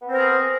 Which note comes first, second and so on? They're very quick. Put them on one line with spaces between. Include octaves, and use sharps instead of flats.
B3 C4 C5 A#4 G#4